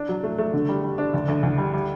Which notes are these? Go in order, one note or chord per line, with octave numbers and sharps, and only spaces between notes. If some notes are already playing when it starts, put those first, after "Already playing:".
Already playing: D4
F#3
A3
A3
D3
G3
G3
D4
D2
D2
D2
G3
G3